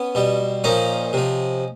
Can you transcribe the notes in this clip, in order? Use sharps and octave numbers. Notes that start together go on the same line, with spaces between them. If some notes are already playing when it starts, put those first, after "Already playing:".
Already playing: B3 C#4
B2 G3
A#2 F3 C#4 D#4
C3 F3